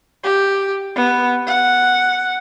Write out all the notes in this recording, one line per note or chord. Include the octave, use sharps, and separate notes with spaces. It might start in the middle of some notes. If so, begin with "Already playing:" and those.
G4
B3
F#5